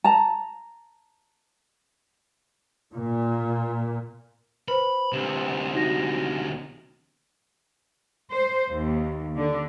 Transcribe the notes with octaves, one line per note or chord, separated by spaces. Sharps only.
A5 A#5
A#2
B4 C5 B5
D2 C3
D#4 F#4 A#6
C5
D#2
D3